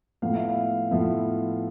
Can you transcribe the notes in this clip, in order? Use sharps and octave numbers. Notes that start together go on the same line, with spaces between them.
A2 F3 B3 F5
E5
F5
A2 F3 B3 E5